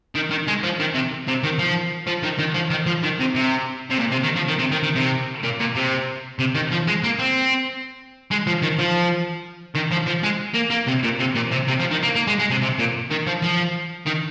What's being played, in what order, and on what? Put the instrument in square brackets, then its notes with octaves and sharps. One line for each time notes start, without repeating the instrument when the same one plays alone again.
[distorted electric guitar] D#3
D#3
G#3
F3
D#3
C3
C3
D#3
F3
F3
D#3
D#3
F3
D#3
F3
D#3
C3
C3
C3
A#2
C3
D#3
F3
D#3
C3
D#3
D#3
C3
A#2
A#2
C3
C3
D#3
F3
G#3
A#3
C4
G#3
F3
D#3
F3
D#3
F3
F3
G#3
A#3
A#3
C3
A#2
C3
A#2
C3
C3
F3
D#3
A#3
A#3
G#3
G#3
C3
C3
A#2
D#3
F3
F3
D#3